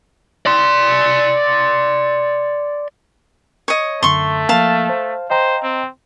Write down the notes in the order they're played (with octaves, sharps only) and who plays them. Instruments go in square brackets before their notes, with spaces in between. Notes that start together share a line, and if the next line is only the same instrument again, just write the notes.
[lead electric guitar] D5 C6
[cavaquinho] C#5 D#5
[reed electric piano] F#2 D3 [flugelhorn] A3 [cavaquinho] C6 C#6
[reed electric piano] F3 A#3 [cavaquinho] F5 A5
[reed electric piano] C5
[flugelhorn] C5 [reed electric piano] D#5 G5 A#5
[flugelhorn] C4